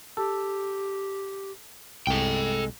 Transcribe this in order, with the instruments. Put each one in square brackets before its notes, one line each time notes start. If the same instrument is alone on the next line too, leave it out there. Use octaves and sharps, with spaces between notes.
[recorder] G4 [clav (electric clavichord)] A4
[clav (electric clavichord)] C2 [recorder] G#3 [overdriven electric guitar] A4 G5